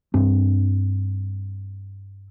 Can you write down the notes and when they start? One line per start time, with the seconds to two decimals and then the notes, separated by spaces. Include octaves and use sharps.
0.14 G2 C4 D4